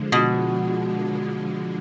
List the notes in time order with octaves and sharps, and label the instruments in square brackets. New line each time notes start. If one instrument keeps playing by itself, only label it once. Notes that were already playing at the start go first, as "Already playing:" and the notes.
Already playing: [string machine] D3 F3 G#3
[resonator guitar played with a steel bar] B2